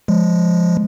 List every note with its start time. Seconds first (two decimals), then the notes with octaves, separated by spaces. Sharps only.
0.08 F3 G#3